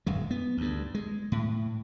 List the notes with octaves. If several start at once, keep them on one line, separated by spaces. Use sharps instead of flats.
D1 F#2 G#3
B3
D2 G2
G#3
A2